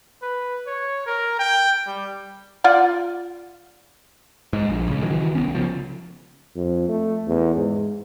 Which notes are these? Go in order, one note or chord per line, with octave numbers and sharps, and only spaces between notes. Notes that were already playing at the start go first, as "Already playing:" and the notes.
B4
C#5
A#4
G5
G3
F4 D5 F#5
G#2
A#1
C#2 C#3
D#3 E3 F#3
C2 B3 C#4
C#3 F3
F2
A3
E2
G#2